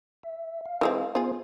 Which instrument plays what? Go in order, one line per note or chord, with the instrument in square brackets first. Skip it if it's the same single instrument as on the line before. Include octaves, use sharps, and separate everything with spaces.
[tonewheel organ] E5
F5
[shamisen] E3 G#3 C4
[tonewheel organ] B3 C5 [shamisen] F4 G#4